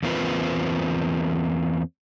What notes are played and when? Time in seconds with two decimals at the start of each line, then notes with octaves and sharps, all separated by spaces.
0.03 E2 A#3 C4 F4 B4